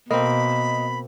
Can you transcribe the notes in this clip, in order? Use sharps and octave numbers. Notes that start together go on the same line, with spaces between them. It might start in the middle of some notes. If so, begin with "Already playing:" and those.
B2 A#3 C4 D#5 B5